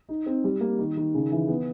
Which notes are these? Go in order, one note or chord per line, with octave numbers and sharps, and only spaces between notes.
D#4
C4
G3
A#3
D#3
D#3
C#3
E3
B3